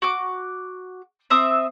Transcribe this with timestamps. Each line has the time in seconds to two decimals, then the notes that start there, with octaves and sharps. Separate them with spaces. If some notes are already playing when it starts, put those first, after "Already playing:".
0.02 F#4 D6
1.30 C4 E5 D#6